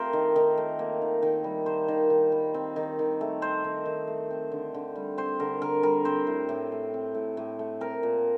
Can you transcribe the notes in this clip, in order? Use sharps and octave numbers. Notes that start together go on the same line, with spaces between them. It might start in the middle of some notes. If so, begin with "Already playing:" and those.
Already playing: A3 C4 F4 G4 A#4 C5
D#3
D#3
A3
A#3
D#3
D#3
G3
A#3 C5
D#3
D#3
G3
C4
D#3
D#3
A3
C4 C5
D#3
D#3
A3
C4
D3
D3
G3
C4 C5
D3 A#4
D3 A#4
G3 A#4
C4 C5
A2
A2
A3
C4
A2
A2
A3
C4 A#4
A#2